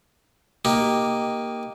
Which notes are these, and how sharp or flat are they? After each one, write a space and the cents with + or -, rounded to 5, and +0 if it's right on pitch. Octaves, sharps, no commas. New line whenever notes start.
A#3 +0 D#4 +0 G4 +0